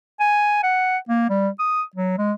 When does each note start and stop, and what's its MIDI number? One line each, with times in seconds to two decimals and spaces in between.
0.20 0.61 80
0.63 0.98 78
1.09 1.26 58
1.30 1.49 55
1.59 1.82 87
1.95 2.14 54
2.18 2.33 56